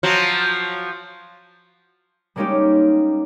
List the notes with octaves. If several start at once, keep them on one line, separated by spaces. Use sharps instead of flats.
F3 F#3 F#4
G3 G#3 A#3 C#4 D#4 G4